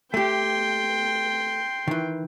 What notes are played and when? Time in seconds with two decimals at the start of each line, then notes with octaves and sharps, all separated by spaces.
0.14 A3 G4 G5 C6
1.87 D#3 E3